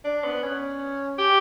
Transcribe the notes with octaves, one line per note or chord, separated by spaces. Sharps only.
D4
B3
C#4
G4